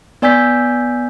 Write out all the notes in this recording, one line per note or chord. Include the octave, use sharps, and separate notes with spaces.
B3 D5 G#5 E6 G6 B6